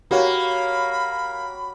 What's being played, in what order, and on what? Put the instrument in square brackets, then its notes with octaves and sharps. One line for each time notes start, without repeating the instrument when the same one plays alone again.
[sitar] A#3 [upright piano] F#4 G4 C#5 [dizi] B5